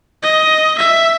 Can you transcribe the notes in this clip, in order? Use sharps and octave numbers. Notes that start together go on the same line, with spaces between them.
D#5
E5